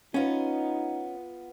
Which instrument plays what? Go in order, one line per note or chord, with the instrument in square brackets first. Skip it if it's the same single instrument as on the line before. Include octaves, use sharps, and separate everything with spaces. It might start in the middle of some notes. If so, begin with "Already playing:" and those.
[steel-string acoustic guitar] B3 F4 [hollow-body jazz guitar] C#4 [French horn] D#4